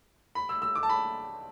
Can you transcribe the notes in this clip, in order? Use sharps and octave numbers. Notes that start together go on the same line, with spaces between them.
B5
E6
E6
D6
A5
B5